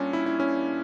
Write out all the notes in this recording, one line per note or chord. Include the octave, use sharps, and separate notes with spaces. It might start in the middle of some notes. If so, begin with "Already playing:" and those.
Already playing: A#2 G3 C#4 D4
E4
E4
C#4